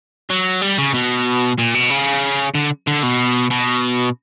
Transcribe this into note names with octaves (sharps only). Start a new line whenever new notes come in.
F#3
G3
C#3
B2
A#2
B2
C#3
D3
D3
B2
B2